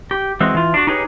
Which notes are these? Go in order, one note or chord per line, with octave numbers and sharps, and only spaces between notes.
G4
E3 G#3 C4 F#4
E3 F4
D4 F#4
D#4 G4 G#4 B4 C#5